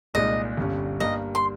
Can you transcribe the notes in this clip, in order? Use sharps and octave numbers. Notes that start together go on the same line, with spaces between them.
C2 A#2 G#3 D#4 D#5
G1 G2 G3 C#4
G2 G3 A#3 D#5
C6